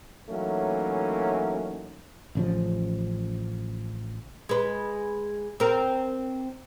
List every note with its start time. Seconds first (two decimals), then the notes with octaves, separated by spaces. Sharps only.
0.29 E3 F#3 A3 A#3 C#4 D#4
2.35 A1 C#3 F3
4.49 G#3 B4
5.60 C4 A#4